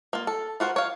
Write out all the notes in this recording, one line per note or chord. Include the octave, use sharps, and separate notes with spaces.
A#3 F4
A4
F4 F#4 A#4 C5
C#5 F5